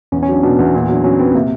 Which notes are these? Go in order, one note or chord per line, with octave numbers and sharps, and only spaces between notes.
E2 C#4
C#4
F#3 D4
B2 D4
E2
A#2
F#3 D4
F#3 C#4
B3 C4
C3 A#3